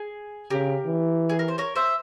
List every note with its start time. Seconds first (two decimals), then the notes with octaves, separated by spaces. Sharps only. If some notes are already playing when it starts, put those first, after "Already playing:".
Already playing: G#4
0.50 C#3 G4 A#4
0.86 E3
1.29 G#4
1.39 A#4
1.48 C5
1.58 A#4 C#5
1.76 C5 E5